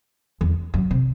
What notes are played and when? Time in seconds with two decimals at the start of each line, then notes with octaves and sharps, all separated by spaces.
0.41 E2
0.74 F#2
0.91 C3